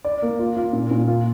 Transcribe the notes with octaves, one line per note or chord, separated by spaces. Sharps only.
D5
A#3
F4
F4
A#2
A#2
F4